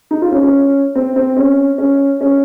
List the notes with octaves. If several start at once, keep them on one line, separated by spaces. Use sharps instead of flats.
D#4
F4
C#4
C#4
C4
C4
C#4
C#4
C#4